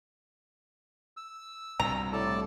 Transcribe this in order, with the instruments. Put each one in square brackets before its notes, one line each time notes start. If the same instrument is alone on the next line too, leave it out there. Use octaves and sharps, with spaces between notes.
[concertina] E6
[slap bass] C2 G2 B2 [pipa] A#5
[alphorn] A2 [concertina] A4 D5 A5